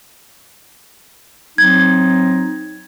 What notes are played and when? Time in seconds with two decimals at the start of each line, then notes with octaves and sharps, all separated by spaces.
1.58 F#3 C4 D#4 G#6